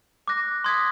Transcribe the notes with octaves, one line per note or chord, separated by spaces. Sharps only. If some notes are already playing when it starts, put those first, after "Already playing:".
D6 F#6 A#6
C6 D#6 G#6 B6